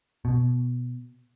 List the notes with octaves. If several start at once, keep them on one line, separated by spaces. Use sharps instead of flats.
B2